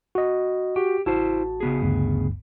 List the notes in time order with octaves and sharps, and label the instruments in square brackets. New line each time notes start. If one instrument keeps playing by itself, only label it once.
[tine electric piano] F#4 D#5
[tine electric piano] F#4 [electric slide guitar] G4
[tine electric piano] A1 F#4 A5 [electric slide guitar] E4 C5
[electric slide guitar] C#3 B3 G#4
[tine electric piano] G1 D2 G2